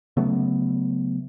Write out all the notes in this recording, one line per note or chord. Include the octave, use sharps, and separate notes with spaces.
C#3 F#3 A3 B3